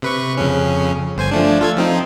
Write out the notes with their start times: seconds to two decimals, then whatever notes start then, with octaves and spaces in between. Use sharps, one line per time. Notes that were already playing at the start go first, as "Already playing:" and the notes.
0.02 C3 B4 C#6
0.37 F2 C#3 C#4
1.17 G1 C5 G#5
1.31 F3 A3 D4
1.61 F4 A4 G#6
1.76 F3 C4 D#4